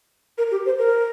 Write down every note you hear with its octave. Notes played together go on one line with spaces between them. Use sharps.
A#4
G4
C5
A#4